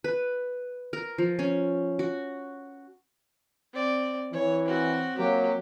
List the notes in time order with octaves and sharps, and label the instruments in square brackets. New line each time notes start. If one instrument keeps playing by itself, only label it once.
[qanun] B4
A#4
F3
C#4
F#4
[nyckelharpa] C4 D5
[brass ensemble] E3 [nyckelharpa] C#5
[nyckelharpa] C4 F#4
[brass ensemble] F#3 A#3 [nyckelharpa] G4